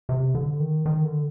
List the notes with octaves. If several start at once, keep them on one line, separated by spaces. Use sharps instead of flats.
C3
D3
D#3
D#3
D3